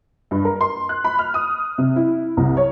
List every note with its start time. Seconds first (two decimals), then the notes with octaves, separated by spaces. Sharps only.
0.31 G2
0.45 A#4
0.61 C6
0.89 F#6
1.04 B5
1.19 F6
1.34 D#6
1.78 C3
1.96 E4
2.37 C2
2.57 C#5